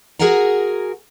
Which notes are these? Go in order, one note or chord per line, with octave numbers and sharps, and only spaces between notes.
F#4 G#4 A#4 F#5 G#5 A#5